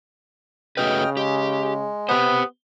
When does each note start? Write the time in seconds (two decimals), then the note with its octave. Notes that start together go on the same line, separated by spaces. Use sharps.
0.77 C#3 A3 F#4 B4 D#5 G5 F6
1.17 G#3 G4
2.09 B3 G4 C5